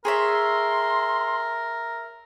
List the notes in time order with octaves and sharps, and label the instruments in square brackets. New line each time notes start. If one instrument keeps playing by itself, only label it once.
[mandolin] G#4 C#5 E5 [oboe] A#4 [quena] C6